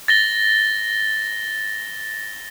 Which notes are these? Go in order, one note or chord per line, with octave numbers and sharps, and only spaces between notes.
A6 A#6 G7